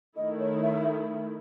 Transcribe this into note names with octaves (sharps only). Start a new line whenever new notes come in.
D#3 A3 E4 D#5
C#5
E5